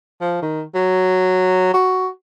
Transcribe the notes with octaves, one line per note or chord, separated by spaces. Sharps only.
F3
D#3
F#3
F#4